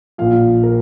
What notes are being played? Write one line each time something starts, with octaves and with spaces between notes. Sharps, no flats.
A#1 A#2 F3 F5
A#4